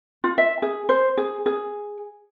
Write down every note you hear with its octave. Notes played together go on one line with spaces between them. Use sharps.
F4
E5
G#4
C5
G#4
G#4